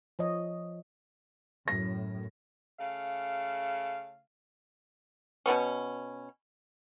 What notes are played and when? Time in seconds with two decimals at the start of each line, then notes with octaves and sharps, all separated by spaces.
0.19 F3 C#5 D#5
1.68 F#2 A2 A#6
2.79 C#3 A3 F5
5.46 B2 D#3 B3 C#4